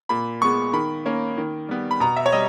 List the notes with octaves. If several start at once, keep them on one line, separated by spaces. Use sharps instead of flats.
A#2 B5
G#3 B3 C#6
D#3 B5
A#3 C#4
D#3
G3 B3
B5
B2 A#5
E5
C#5
G3 D#5